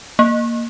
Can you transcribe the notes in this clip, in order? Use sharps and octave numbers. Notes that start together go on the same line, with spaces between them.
A#3